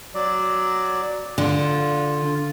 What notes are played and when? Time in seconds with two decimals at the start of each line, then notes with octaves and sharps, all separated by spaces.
0.14 F#3 D5
1.38 D3 F4